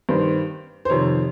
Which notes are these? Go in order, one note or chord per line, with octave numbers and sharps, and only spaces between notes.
G2 D#3 C5
C5
F2 C3 D#3 C#5